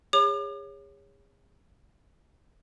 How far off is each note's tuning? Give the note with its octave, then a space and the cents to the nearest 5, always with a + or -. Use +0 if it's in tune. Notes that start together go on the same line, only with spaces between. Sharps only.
G#4 -40 C#5 +0 D6 +40